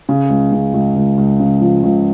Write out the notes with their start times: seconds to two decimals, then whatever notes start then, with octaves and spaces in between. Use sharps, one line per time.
0.09 C#3
0.30 C#2
0.52 C#3
0.74 C#2
0.96 C#2
1.18 C#2
1.40 C#3
1.61 F3
1.83 C#2